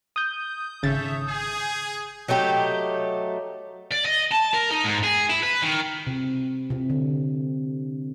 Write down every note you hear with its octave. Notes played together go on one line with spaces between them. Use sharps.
D#6 G6
G#1 C#3 A4 C#5 E5 A6
G#4
F#3 A3 D#4 G4
D5
D#5
A5
A#4
D#4
G#2
G#4
E4
B4
D#3
C3
C3
D3